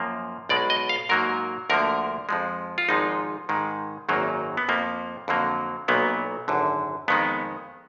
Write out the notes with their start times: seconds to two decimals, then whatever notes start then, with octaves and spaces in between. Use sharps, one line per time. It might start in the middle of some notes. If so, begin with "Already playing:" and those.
Already playing: F#2 F3 A#3
0.49 B1 B2 G#3 D5
0.70 D#5
0.89 F5
1.09 G#2 F#3 A#3 A#4
1.70 D2 D3 F3 A#3 A#4
2.29 F2 F3 G#3
2.78 F4
2.89 G#1 G#2 F3 G#3 D#4
3.49 G#2 D#3 G#3
4.09 G#1 F#2 D#3 F#3 A#3
4.57 B3
4.69 F2 F3 A#3
5.28 F2 D3 F#3 A#3
5.88 B1 A#2 F#3 A#3 B3
6.48 G#1 F#2 D3
7.08 F2 D#3 G#3 B3